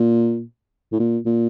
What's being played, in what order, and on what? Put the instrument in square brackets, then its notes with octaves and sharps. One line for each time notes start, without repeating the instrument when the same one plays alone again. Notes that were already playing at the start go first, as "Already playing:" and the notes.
Already playing: [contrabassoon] A#2
A2
A#2
A#2